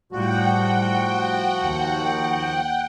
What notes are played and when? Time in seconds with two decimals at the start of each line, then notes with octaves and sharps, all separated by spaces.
0.12 A2 F3 G3 F#4 F#5 G5
1.65 D#2